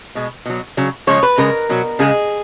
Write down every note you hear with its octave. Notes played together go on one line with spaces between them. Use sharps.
B2 G#3
B2 F#3
C#3 F#3
C#3 F3 G#3 C#5
B4
C#3 G#3 A#4
B2 F#3
C#3 G#3 G#4